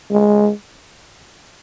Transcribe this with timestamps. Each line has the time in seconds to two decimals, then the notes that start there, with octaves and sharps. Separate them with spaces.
0.11 G#3